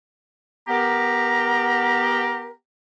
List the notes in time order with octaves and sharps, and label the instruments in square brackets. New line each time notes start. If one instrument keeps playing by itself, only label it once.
[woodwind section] B3 G4 A#4 [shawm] A#5